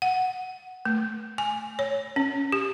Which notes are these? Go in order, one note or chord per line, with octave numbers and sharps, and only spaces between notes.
F#5
A3
G#5
C#5
C#4
G4